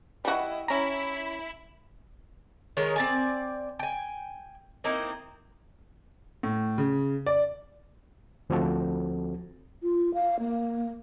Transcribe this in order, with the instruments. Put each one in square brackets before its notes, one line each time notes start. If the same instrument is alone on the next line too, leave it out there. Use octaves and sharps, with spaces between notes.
[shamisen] G3 F#4 [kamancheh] E4 D#5
[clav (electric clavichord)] C#4 A#5 [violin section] E4 [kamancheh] B5
[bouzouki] D#3 G#3 A#4 C#5
C4 D5 G#5
G5 G#5
A#3 C4 D#4 E4
[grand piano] A2
C#3
D5
[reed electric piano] D2 F3 C4 F#4 A4
[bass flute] F4
F5
A#3